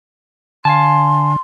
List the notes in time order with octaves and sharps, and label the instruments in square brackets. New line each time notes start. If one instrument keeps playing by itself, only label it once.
[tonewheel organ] D3 [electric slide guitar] F5 G#5 A5 [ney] C6